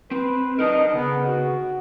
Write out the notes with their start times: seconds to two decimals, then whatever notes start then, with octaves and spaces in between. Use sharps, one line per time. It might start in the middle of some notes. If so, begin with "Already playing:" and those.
0.11 C4 B4
0.59 D4 D#4 A#4 D#5
0.93 C#3 B3
1.27 F#4